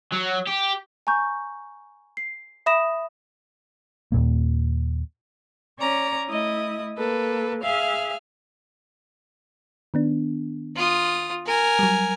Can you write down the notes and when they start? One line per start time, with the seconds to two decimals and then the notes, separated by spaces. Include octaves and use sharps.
0.12 F#3
0.47 G4
1.07 G#5 A#5 C#6 G6
2.17 C7
2.66 E5 B5 D#6 A#6 E7
4.12 D#2 A#2 A#3
5.79 C#4 C#5 D5 A#5
6.29 A3 E4 D#5 D#6
6.97 A#3 A4 B4
7.62 G#4 E5 F5 F6
9.94 D#3 B3 D4
10.76 F4 D#6
11.46 A#4 G#5
11.79 F#3 G3